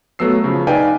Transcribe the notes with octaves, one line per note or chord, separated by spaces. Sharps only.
F#3 A3 B3 E6 C7
C#3 F3
D#4 B4 D5 F5 G5 G#5